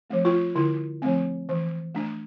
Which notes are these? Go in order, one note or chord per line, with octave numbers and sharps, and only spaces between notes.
F3 A3 C4
F4
D3 E4
F3 A3 C4
E3
A3 D4